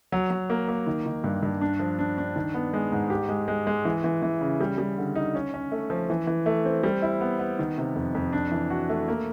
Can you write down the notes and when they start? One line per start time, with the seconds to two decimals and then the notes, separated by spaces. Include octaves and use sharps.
0.12 F#3
0.30 F#3
0.50 A#3
0.69 A#3
0.87 D#3
1.06 D#3
1.24 G2
1.43 G2
1.61 D4
1.80 F3
1.99 D4
2.18 D4
2.36 D#3
2.54 B3
2.74 G#3
2.92 G#2
3.10 G4
3.29 G#3
3.48 G#3
3.67 G#3
3.85 E3
4.04 E3
4.22 E3
4.41 C#3
4.61 G3
4.78 G3
4.98 D3
5.15 D#4
5.35 C#4
5.54 C#4
5.72 A3
5.90 F3
6.10 E3
6.27 E3
6.46 A3
6.65 C4
6.83 G3
7.02 E4
7.21 B3
7.39 B3
7.59 D#3
7.78 C3
7.95 F2
8.15 F2
8.33 D4
8.52 E3
8.70 F#4
8.89 A3
9.08 A#3